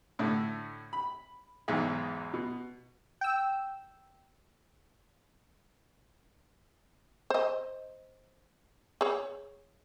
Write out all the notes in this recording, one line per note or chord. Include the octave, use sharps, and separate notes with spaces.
A2 D3 A3
B5
B1 E2 G#2 D#4 G#4 E5
B2
G5 E6
C5 D#5
G#4 C#5